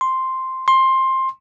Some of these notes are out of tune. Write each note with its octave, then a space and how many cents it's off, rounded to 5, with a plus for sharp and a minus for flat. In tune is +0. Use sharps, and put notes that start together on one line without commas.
C6 +0
C6 +15